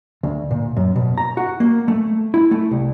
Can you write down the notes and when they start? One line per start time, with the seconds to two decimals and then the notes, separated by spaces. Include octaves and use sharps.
0.23 D2
0.51 A#2
0.77 F#2
0.96 B2
1.18 A#5
1.37 F#4
1.60 A#3
1.88 A3
2.34 E4
2.51 A3
2.71 C2